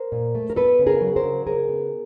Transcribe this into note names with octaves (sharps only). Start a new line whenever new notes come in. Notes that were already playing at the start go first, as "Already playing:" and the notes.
Already playing: A#4 C5
A#2
A3
A#4
B3 A4 B4
C#3
G#4 A#4
F#3
A#4 C5
C#3
C#3 G#4 A#4
B3